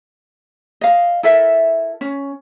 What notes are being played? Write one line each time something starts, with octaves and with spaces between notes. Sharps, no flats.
D#5 F5
E4 A4 A#4 E5
C#4